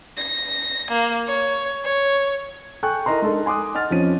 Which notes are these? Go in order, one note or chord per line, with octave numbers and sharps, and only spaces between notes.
A#6
A#3
C#5
C#5
A4 G5 G#5 C#6 F#6
E4 A#4 D#5 A#5 C6
G#3 D4 D#4 A4 A#4
G#5 C6 D6 D#6 F#6
D#5 F#5 F6 A6
F2 F3 C4 C#4 D#7